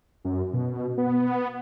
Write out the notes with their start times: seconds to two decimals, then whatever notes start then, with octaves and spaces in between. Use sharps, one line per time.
0.25 F#2
0.53 B2
0.98 B3